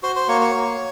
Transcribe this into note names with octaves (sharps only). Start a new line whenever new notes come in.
F#4 C5 C6
C5 C6
A#3 C#5 C#6
C#5 C#6
A#3